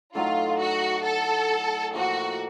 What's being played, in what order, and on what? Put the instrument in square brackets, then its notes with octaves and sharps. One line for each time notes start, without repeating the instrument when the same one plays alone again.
[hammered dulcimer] A2 F#3 A3 D#4 [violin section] F4
[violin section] F#4
A4
[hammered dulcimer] A2 F3 A#3 [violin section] F#4